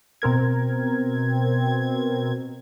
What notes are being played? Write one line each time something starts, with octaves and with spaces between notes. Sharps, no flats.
B2 C4 A#4 G#6